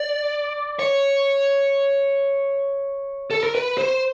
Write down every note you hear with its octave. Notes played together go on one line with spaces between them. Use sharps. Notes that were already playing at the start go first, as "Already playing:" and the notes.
Already playing: D5
C#5
A4
A#4
B4
C5